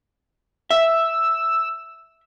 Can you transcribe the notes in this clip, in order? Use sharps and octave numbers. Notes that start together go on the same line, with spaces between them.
E5 E6